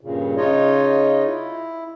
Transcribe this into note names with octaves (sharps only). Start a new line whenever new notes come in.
G2 A#2 C#3
C#3 D#4 F4 C#5 D#5
E4